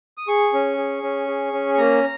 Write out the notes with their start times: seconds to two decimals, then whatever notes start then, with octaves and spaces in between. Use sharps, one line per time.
0.18 D#6
0.28 G#4 C#6
0.53 C#4
0.77 G#4
1.03 C#4
1.28 G#4
1.53 C#4
1.74 C#6
1.78 A#3 A#5